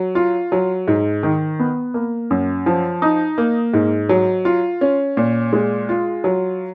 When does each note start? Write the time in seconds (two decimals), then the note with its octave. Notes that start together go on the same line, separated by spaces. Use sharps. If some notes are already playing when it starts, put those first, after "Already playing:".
Already playing: F#3
0.15 F4
0.52 F#3
0.88 G#2
1.23 D#3
1.59 B3
1.94 A#3
2.31 F#2
2.66 F3
3.02 D#4
3.38 A#3
3.74 G#2
4.09 F#3
4.45 F4
4.81 C#4
5.17 A#2
5.53 G#3
5.89 F4
6.24 F#3